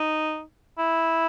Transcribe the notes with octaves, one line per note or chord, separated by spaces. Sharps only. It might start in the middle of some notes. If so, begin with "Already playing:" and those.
Already playing: D#4
E4